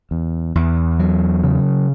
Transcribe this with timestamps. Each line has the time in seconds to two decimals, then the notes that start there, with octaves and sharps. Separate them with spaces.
0.11 E2
0.55 E2
0.99 F#3
1.43 C#3